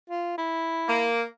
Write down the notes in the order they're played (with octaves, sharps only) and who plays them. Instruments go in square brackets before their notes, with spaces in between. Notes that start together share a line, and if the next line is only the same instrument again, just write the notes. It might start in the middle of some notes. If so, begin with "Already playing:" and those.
[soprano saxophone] F4
E4
[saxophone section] A#3